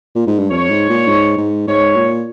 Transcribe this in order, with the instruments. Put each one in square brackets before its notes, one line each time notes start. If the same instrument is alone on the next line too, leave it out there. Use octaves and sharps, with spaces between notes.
[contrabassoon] A#2
G#2
G2
[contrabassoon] F2 [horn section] C#5
[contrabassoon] G#2
A#2
G#2
G#2
[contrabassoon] G#2 [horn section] C#5
[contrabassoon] A#2